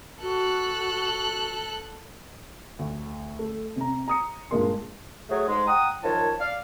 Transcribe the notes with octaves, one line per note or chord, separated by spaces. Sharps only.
F#4 A4 F#6
D2
A3
C3 A#5
A#5 D#6 C#7
G2 A#2 G#3 A#3 C6
F#3 A3 G#4
G#2 G#3
F#5 G5 A#5 D#6
F#2 D#3 F3 F4 C#5 A5
D5 F5